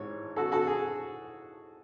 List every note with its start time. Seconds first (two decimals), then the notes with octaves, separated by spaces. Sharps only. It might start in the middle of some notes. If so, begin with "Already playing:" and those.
Already playing: A1 G#2 G#3 C#5
0.36 F#4 A4
0.52 F#4 A4
0.67 G#4